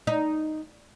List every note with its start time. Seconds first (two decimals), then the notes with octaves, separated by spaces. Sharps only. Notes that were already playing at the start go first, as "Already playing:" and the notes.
0.07 D#4